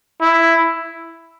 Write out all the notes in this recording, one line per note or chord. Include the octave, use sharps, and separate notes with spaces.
E4